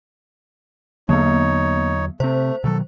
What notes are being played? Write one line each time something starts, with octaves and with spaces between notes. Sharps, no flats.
E2 D3 F#3 A#3 B3 D#4 C#5
C3 A3 C4 C5
B2 D#3 F#3 A4